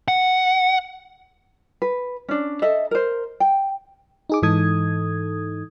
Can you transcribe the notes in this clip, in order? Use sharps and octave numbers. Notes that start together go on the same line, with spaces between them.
F#5
B4
C#4 D4
A4 D#5 E5
A#4 C5
G5
D#4 G#4 D6
G#2 E3 D#4 A4 D#6 G#6